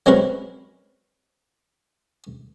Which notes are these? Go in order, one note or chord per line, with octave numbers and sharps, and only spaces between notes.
F#3 G#3 C4 C#4 A#4 B4